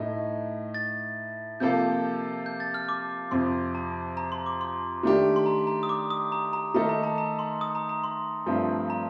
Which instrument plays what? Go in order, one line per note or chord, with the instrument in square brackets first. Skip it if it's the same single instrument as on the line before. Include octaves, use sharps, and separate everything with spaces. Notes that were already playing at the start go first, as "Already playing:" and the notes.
Already playing: [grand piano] A2 A3 D#4
[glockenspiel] A6
[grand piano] C3 F3 A#3 F4 A4 [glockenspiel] G6
[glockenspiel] G6
A6
F6
D6
[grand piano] F2 C3 F3 [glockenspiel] C6
[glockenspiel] A5
A#5
C6
D6
C6
[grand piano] D#3 A3 D4 G4
[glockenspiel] C6
A#5
A#5
D#6
D6
D#6
A#5
A#5
[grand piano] D#3 A3 D#4 A4 [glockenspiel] A#5
[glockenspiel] A#5
A5
A#5
C6
D#6
A#5
A#5
C6
[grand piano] G2 F3 A3 C4
[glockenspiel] A#5